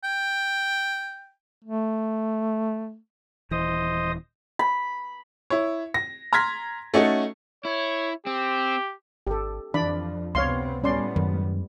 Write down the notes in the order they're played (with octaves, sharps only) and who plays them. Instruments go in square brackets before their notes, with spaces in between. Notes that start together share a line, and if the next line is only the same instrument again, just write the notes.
[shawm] G5
[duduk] A3
[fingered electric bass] D#1 E3 [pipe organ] C5 D#5 D#6
[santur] B5
[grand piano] E4 C#5
A#6
A#5 C6 F6 G#6 A#6 B6
A3 C#4 D#4 F#4 A4
[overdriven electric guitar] E4 [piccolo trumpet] C#5
[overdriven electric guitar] C4 [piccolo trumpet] G4
[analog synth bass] G#1 [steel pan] G4 A4
[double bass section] F2 F3 [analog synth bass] E3 [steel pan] D4 D5 B5
[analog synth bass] C#2 [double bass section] C3 B3 C4 [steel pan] C#5 F5 C6
[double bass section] A2 G3 B3 [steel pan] C#4 D5 C6
[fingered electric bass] F#2 [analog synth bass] D#3